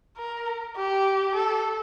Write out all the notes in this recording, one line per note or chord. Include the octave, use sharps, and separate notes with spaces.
A#4
G4
A4